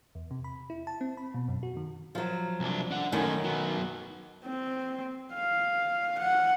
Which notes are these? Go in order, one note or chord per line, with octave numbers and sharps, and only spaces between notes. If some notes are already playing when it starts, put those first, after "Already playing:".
E2
C3
B5
E4
A5
C4
B5
B2
F#2
F#4
D#3
F3 F#3
C2 D4
D4 F#5
F#2 D#3 A3 C#4
F#3 B3
C4
F5
F#5